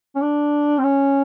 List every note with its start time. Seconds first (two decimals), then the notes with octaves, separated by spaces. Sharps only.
0.15 C#4
0.22 D4
0.78 C4
0.84 C#4